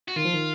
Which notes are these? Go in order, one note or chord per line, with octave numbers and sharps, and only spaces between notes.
F#4
D#3 F4
F3
D#3